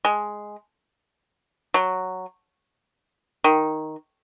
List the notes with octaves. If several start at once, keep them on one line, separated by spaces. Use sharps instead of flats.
G#3
F#3
D#3